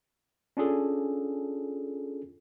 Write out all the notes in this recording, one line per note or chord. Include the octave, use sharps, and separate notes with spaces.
C#4 D4 F4 G#4 A4